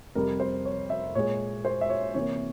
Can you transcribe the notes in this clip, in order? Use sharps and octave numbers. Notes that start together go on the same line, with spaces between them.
F2 C3 G3 A#4
C5
C#5
E5
A#2 G#3 C#5
C5
E5
C#5
C3 E3 A#3 C#5